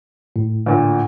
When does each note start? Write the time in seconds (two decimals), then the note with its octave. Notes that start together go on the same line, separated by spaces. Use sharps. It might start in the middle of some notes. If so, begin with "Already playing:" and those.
0.36 A2
0.66 D2 A#2